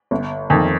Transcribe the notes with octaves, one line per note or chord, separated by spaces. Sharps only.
G1
F2 D#3